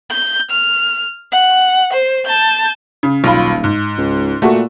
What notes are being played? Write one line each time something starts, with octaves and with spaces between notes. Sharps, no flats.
G6
F6
F#5
C5
A5 G6
C#3
D#1 B1 F4 B5
G#2
C#2
A#2 A3 F#4